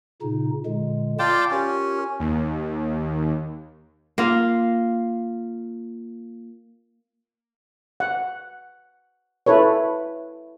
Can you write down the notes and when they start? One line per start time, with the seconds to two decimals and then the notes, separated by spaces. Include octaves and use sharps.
0.21 A#2 C#3 D#4
0.66 A#2 D3 G#3
1.19 F4 D5 G5 A5 D6
1.51 C#4 F4 G4 A#4
2.19 D#2
4.18 A#3 F4 F5
8.00 F#5
9.46 E4 A4 B4 C#5